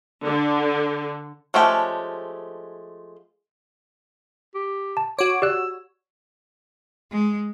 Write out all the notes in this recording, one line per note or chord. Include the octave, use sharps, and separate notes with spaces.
D3
F3 G#3 A3 C#4 G4
G4
A5
F#4 C#5 D6
G4 D5 E6 F#6
G#3